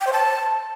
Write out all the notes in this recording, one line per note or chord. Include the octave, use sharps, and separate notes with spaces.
G5
C5
A5